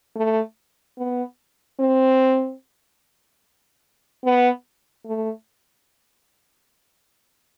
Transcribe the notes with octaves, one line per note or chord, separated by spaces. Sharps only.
A3
B3
C4
B3
A3